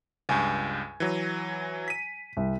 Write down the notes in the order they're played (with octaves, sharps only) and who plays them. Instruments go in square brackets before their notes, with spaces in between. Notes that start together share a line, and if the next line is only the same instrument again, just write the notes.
[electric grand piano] C#2 G2 [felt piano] G#5
[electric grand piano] E3 F#3
B6 D#7
[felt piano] C2